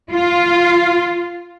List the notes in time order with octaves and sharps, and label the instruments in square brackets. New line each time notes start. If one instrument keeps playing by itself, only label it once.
[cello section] F4